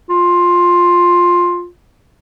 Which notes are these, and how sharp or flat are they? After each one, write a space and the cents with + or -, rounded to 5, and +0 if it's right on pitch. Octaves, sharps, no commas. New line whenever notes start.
F4 +10